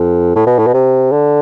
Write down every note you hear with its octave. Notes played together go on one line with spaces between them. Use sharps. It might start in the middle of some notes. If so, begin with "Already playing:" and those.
Already playing: F2
A2
B2
A2
B2
C3
D3